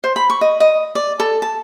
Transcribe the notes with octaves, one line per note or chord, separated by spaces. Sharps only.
C5
B5
C#6
D#5
D#5
D5
A4
A5